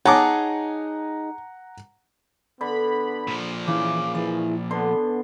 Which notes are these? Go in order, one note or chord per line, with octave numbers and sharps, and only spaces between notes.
D#4 G#4 C#5 F#5 A5 A#5 D6
D3 B3 B5
A#2 F3
C#3 E3 D6
E3 G#4 D5
D3 B3 A5 C6